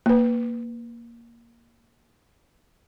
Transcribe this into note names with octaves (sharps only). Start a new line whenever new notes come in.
A#3 B4